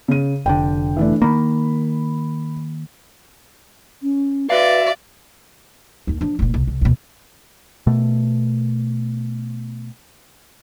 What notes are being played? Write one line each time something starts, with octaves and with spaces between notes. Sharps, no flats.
C#3 D#7
F1 D3 G5
E3 A3 D4
D#3 A#3 B5
C#4
F#4 B4 D5 E5 F5
D#2 D#4
F3 D4
F1 A#2
C2
C2
D#2 B2
B2 A3